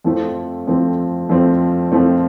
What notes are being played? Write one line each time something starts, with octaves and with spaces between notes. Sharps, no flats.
F2 F3 A3 C4
F2 F3 A3 C4
F2 F3 A3 C4
F2 F3 A3 C4